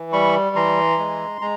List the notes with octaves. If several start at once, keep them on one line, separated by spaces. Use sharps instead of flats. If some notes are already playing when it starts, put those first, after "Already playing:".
Already playing: E3
G3 B5 C#6
E3 A#5 C6
G#3
G#3 A#5